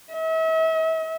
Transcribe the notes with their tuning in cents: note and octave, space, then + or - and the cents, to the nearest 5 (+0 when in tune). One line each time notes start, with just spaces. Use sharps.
E5 -40